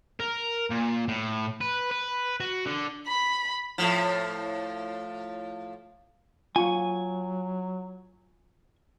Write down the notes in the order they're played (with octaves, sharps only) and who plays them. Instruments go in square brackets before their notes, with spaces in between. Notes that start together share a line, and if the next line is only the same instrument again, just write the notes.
[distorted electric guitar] A#4
A#2
A2
B4
B4
F#4
D3
[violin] B5
[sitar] A2 F3
[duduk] F#3 [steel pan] F4 C#6 [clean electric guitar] G#5